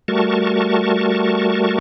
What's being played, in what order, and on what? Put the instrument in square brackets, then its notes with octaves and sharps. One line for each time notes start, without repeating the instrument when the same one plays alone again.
[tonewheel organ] G3 A3 F#4 A#4 A5 C#6